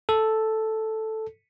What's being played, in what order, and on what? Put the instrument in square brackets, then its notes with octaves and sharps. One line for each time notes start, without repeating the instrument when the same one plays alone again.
[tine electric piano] A4